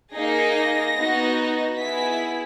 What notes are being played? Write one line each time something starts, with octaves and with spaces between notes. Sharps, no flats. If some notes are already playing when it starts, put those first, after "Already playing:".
A#3 D#4 G#4 A#6
B3 D#4 F#4
B3 E4 G#4 B6